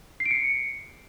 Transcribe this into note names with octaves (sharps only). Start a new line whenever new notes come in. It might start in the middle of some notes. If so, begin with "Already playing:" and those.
C7
D7
C#7